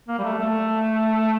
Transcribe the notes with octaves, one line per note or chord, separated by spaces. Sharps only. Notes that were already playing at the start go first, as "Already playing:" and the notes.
A#3
G3
A3
A3